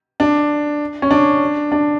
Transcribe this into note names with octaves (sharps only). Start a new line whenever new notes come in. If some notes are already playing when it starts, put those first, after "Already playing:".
D4
C#4
D4
D4